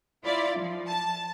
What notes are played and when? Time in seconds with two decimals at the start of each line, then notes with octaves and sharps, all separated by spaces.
0.24 E4 F4 D5
0.58 F3
0.88 A5